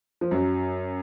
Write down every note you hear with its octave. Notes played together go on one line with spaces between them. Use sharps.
F3
F#2 F#3